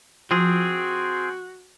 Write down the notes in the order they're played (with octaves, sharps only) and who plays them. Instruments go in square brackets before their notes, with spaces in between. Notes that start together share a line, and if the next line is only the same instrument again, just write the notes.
[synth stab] F3 [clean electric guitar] C4 G#4 [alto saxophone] F#4